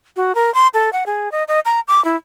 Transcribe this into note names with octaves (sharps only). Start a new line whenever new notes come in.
F#4
A#4
C6
A4
F#5
G#4
D#5
D#5
A#5
D6
E4